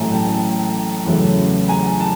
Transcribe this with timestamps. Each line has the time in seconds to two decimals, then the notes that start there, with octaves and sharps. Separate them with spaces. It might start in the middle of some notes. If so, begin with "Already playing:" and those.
Already playing: A1 A2 F#3 A3 G#5 A#5
0.11 G5 A5
1.05 E2 C#3 F#3 A3
1.68 G#5 A#5
2.00 A5